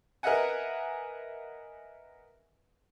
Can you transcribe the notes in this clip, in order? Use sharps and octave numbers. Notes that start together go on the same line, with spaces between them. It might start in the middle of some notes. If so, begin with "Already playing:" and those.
A#4 B4 D#5 E5 F#5 G#5